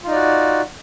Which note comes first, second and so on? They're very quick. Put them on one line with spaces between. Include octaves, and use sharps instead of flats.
F4 D#4 D5 F#4